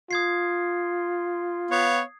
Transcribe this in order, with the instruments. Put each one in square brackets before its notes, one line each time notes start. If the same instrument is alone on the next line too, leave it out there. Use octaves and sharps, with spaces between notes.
[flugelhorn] F4 [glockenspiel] D#6 G#6 C7
[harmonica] B3 F5 [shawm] C#5